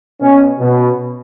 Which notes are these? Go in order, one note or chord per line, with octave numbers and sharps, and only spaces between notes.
B2 C#4
B2